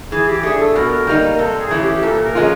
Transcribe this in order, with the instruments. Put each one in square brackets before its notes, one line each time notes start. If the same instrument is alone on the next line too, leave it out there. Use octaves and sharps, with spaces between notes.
[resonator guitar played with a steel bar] E3 [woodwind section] G#4
[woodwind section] G4
[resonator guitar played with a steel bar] A3 D4 [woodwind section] G#4
[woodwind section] A4
[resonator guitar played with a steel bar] B2 [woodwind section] A#4
[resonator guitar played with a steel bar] G3 A#3 D#4
[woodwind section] A#4
[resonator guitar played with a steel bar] C3 [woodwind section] A4
[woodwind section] G#4
[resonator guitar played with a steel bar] E3 A3 C#4
[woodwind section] G4
[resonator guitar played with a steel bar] A#2 [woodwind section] A4
[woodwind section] A#4
[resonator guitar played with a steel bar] F3 G#3 C#4 F4